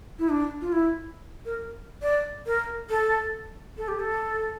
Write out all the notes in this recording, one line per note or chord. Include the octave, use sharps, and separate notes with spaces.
E4
D4
F4
E4
A#4
D5
A#4
A4
A4
G4
A4